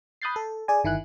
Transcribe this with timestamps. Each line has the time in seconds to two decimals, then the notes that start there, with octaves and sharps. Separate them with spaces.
0.22 B5 D#6 F#6 G6 A6 C7
0.36 A4
0.68 G#4 D5 G#5
0.84 G1 D#3 E4 G#5 F#6